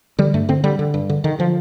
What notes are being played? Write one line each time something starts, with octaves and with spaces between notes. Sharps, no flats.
D3 G3
G2 A3
D3 C4
D3 G3
D3
G2
D3
D3 D#3
D3 F3